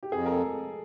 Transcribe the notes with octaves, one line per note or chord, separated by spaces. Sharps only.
G4
F2 G#4
A#4
A4